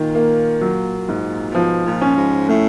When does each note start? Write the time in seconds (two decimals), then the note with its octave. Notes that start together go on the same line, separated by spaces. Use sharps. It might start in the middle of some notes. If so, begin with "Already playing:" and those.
Already playing: A#2 D#3
0.15 A#3
0.61 F#3
1.09 G#2
1.51 A#2
1.54 B2 F3
1.86 A#2
2.01 C#4
2.17 G#2
2.48 A2 A3